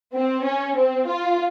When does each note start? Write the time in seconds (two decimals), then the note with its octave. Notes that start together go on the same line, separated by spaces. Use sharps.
0.14 C4
0.45 C#4
0.77 C4
1.07 F4